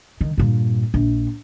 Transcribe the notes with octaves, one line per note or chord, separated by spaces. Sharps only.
D#3
G2 A#2
A#1